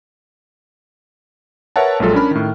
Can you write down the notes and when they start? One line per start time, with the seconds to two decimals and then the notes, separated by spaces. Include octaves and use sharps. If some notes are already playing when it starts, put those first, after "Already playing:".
1.76 A#4 B4 C#5 E5 F#5 A5
2.00 A#1 F#3 G#3 F4 A4
2.14 C#4 D4 A#4 B5 F6
2.31 A2 D#3